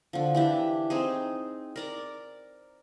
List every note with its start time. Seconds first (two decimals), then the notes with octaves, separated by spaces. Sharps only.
0.13 D3 F3
0.35 E3 D4 G4
0.90 C4 D#4 G#4
1.76 A#4 D5 A#5